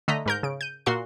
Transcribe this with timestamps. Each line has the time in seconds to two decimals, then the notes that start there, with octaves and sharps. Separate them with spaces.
0.08 D3 A3 D#5 A#5 B6
0.26 G#2 A#4 G6
0.43 C#3 D7
0.61 G6 D#7
0.86 A#2 F#4 F5 C6 C7